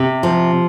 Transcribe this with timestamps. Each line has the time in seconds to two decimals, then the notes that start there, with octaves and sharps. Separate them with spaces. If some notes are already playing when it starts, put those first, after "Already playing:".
Already playing: C3
0.23 F3